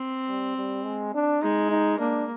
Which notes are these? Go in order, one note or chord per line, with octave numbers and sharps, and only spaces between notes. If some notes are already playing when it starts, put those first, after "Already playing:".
Already playing: C4
G3
G3
G#3
D4
G#3 D#4
D#4
A#3 D4